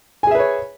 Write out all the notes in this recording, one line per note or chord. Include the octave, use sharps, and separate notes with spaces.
G#4 B4 C#5 E5 G#5